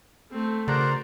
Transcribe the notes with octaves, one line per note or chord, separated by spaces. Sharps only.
A3 C4
C#3 F#4 A#4 C5 D5 F#5 A#5